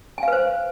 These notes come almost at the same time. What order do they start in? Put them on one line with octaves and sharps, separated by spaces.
G#5 F5 B4 C5